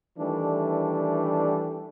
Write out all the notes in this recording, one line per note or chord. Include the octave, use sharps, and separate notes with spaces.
D#3 E3 G3 A3 D4